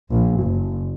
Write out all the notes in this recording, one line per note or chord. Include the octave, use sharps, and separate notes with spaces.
A#1
F#1